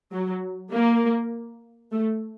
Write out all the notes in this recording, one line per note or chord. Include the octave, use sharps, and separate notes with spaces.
F#3
A#3
A3